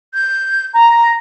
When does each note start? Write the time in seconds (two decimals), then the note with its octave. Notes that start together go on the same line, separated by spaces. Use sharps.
0.14 G6
0.73 A#5